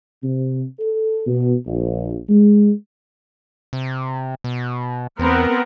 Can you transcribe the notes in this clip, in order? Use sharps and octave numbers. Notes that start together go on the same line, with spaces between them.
C3
A4
B2
A#1
G#3
C3
B2
E2 B3 C4 A#4